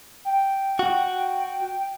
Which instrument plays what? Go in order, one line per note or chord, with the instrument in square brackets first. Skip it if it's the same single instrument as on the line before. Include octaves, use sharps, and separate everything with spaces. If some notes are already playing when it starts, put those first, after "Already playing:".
[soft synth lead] G5
[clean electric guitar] F#4